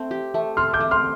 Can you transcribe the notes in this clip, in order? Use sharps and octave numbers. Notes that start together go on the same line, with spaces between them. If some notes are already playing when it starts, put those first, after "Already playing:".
Already playing: A3 C4
G4
A3
A4 C6 F6
D6 G6
A3
C6 F6